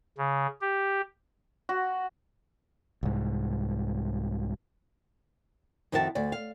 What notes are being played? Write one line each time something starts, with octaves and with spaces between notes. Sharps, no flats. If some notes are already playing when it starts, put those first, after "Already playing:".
C#3
G4
F#4
C2 G#2
F2 D#3 E4 F#4 A#4 A5
D2 D5
F5